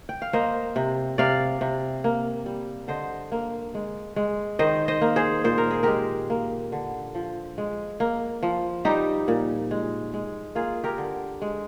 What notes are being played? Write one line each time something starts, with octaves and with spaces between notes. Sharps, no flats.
G5
F5
A#3 C5 D#5
C3
C3 D5 F5
C3
A#3
G3
D3 C5 D#5
A#3
G#3
G#3
D#3 C5 D#5
C5 D#5
A#3
G#4 C5
A#2 C5
A#4
G#4
G#3 G4 A#4
A#3
D3
F3
G#3
A#3
F3
G3 D#4 G4
A#2
G#3
G#3
A#3 F4 G#4
G4 A#4
D3
G#3